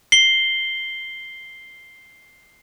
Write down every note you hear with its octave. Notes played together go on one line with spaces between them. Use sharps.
C7 G7